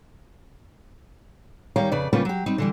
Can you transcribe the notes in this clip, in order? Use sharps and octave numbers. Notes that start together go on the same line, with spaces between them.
D#3 G3 G4 C#5 F5 A#5
F2 C#3 B4 D5
C#3 G3 A#3 C#4 F4 B4
F#3 G4
G3 C4 D#4
D3 E3 G3